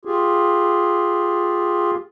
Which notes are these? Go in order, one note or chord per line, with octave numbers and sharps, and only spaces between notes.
F4 G4 G#4